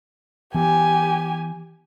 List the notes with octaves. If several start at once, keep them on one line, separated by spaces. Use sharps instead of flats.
E3 B3 G4 G#5